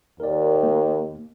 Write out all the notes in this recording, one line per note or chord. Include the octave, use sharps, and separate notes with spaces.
D#2 A#4 D5
A#3